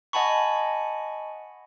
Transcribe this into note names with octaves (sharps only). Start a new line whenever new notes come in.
D#5 F#5 G#5 A5 B5 C#6